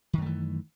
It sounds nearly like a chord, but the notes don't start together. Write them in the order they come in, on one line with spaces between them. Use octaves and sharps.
D#3 F#2 A3 E3